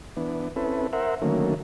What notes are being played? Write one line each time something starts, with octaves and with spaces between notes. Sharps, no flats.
E3 B3 D4
C4 C#4 E4 A4 B4
A#4 C5 E5 F#5
D3 D#3 F#3 A3 A#3 C#4